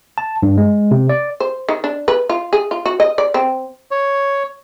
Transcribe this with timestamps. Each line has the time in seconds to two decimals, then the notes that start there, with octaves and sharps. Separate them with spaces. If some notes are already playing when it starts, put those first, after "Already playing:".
0.18 A5
0.43 G2
0.58 G#3
0.91 C3
1.09 D5
1.40 C5
1.69 D#3
1.84 D4
2.08 B4
2.29 F4
2.53 G#4
2.71 F4
2.86 F#4
3.00 D#5
3.18 D5
3.34 C4
3.91 C#5